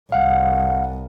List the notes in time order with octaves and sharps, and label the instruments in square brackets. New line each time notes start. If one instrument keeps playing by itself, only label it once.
[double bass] C2 [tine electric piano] F5 F#5